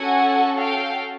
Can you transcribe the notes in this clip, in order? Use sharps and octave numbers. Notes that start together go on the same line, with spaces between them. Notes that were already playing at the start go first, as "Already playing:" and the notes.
Already playing: C#4 F#4 A4 F#5 G#5
F5 G5